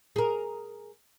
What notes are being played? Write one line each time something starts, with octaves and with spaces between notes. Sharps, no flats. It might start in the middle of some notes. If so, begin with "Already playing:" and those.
G#4 A#4